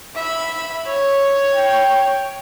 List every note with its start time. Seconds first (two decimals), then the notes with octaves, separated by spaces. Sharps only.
0.15 E5 B5
0.86 C#5
1.55 G5